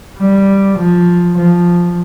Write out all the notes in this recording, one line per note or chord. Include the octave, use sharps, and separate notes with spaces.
G3
F3
F3